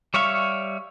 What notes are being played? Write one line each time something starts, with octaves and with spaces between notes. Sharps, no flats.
G3 C#5 E5 F5 C#6